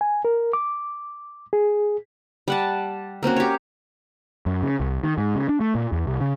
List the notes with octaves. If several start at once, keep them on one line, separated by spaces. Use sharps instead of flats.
G#5
A#4
D6
G#4
G3 F#5 A5
A#3 C4 C#4 F#4
G4 C#5
F#2
C#3
C2
D#3
G#2
C#3
D4
A3
A#2
E2
C2
C#3